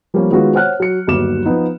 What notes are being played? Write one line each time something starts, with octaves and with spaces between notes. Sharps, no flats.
F3 G3 A#3 B3 C#4
D#3 G#3 B3 C#4 F4 F#4
C5 C#5 F#5 F6 F#6
F#3 C#7
G1 D#2 F#3 D6 E7
F3 B3 D#4